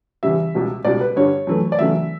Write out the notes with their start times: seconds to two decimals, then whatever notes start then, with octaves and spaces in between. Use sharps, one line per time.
0.23 E2 C#3 G3 E5
0.54 C#2 B2 G3
0.85 C#2 B2 G3 D5
1.01 B4
1.16 G2 D3 G3 C#5
1.47 F#2 E3 A3
1.72 D5
1.79 E2 C#3 F#3 A3 E5